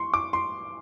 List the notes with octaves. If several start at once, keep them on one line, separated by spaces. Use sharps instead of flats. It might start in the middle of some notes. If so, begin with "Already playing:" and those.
Already playing: C6 C#6
D6
C6